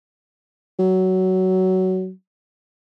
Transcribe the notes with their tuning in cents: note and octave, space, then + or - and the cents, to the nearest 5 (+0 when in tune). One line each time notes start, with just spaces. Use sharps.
F#3 +15